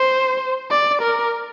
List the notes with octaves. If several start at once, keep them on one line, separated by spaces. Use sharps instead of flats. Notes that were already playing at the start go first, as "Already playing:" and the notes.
Already playing: C5
D5
A#4